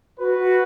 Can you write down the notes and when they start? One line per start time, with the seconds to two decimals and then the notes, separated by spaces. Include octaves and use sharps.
0.19 F#4 B4
0.39 F#4